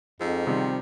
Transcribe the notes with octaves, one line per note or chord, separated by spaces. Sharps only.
F2 G#2 F3 E6
C3 D#3 G3 C4